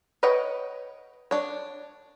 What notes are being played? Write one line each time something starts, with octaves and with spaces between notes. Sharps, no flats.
B4 C#5 D#5 F#5 G5
D4 C#5